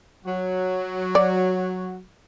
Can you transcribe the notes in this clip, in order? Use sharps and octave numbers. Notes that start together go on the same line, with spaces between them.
F#3 F#4
D5